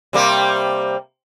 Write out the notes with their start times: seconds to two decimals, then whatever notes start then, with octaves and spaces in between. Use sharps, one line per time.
0.13 C3 G3 A#3